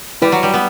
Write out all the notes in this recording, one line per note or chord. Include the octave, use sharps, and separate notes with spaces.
G3 E4 B4 D5 G5
F#3
G3
B3